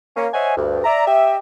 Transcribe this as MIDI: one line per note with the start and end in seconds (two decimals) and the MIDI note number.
0.16 0.28 58
0.16 0.28 61
0.33 0.56 72
0.33 0.56 73
0.33 0.56 75
0.33 0.56 76
0.33 0.56 78
0.33 0.56 80
0.57 0.80 38
0.57 0.80 43
0.84 1.05 74
0.84 1.05 76
0.84 1.05 82
1.06 1.37 67
1.06 1.37 75
1.06 1.37 76